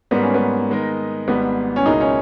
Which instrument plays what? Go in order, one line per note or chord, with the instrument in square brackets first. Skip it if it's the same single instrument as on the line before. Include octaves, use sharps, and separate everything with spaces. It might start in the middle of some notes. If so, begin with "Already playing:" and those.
[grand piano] G#2 G3 A#3 [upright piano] B3
[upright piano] C#4
B3
[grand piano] D#3 G#3 D#4 A#4
[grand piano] G#1 G#2 G3 [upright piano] B3
[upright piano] C#4
[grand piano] C#2 B2 A#3 E4 G#4 [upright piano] D#4
[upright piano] C#4